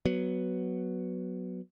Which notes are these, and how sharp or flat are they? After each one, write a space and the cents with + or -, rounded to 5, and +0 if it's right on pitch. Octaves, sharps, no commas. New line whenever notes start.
F#3 +0 B3 +0